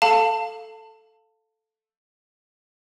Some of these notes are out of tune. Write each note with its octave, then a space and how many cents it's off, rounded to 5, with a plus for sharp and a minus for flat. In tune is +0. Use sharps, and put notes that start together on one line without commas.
A4 +0 F5 +0 A5 +25